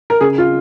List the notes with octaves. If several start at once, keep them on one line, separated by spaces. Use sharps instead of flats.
A#4
C#3 G#4
F4